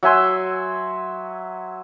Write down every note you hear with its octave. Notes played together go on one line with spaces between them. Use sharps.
F#3 E5 G#5 C6